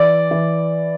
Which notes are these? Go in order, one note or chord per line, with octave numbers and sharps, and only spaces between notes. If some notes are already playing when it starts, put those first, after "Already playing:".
Already playing: E3 D5
E3